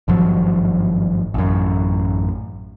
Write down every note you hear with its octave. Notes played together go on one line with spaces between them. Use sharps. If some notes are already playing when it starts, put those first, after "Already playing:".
G#1 G2 F3 F#3
A1 F#2